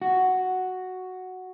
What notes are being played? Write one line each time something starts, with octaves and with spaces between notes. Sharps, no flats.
F#4